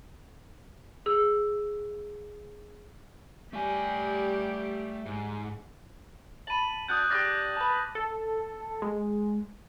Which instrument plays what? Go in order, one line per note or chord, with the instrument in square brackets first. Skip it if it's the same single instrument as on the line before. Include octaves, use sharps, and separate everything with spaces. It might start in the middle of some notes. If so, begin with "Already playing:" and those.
[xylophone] G#4 E6
[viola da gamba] G3 G4 [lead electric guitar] A3 G#5
[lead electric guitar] G#2
[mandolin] A5 B5 [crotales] D#7 F#7
[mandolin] D4 F#4 [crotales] D#6 F#6 G6
[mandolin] D4 F4 G4 [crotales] D6 A6 A#6
[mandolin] B4 A5
[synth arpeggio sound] A4
G#3